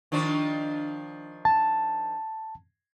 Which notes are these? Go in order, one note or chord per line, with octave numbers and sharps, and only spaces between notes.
D#3 F3 D4
A5